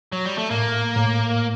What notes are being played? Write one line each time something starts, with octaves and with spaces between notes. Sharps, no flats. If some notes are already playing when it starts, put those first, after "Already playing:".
F#3
G3
A3
A2 A#3
A2